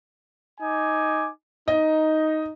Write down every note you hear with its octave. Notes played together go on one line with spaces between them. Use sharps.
D#4 G#5 D6
D#4 D#5